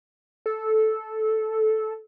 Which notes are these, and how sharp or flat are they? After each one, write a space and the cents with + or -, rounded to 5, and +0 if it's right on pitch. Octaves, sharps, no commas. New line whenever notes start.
A4 -10